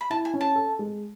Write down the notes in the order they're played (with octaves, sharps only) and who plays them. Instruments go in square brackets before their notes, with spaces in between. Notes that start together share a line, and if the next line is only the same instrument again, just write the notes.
[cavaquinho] B5
[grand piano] E4 [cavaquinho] A5
[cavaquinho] G#5
[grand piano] C#4
[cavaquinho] A5
[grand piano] A4
G#3